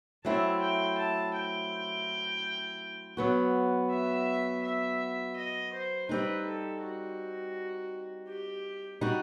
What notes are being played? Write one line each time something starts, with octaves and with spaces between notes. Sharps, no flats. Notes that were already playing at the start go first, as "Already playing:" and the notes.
F#3 A3 C4 E4 A5
G5
A5
G5
F#3 B3 F#4
E5
E5
D#5
C5
G3 C4 D#4 B4
A4
F#4
G4
G3 D#4 F#4